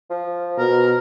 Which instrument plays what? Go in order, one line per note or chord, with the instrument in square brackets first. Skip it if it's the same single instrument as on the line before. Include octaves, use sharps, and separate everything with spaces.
[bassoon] F3
[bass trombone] B2 [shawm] A#4